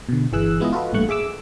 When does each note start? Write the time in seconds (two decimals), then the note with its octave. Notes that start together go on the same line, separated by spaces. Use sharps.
0.09 B2 D3
0.32 G1 E3 G#4 E6 F#6
0.60 G#3 B3 E4 F4 G#4 D#5
0.73 F4 F#4 A4 B4 D#5
0.93 A1 G2 A#2 A3 C#6 F#6
1.09 G#4 E5 D6 E6